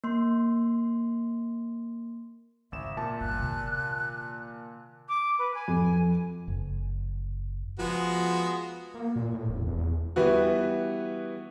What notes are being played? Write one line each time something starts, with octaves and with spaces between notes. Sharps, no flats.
A#3 C6
G#1 F2 C#3 E5 E7
A#2 A5
G1 G2 F#6
C3 D#3
D6
B4
G#5
F2
F#1
F3 G#3 B3 F#4
A#3
A#2
A2
E1
E2
E3 G3 B3 F#4